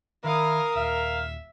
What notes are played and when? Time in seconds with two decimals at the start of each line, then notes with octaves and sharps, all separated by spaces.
0.24 D#3 E4 A#4 F5 D#6
0.75 D#1 E5 F5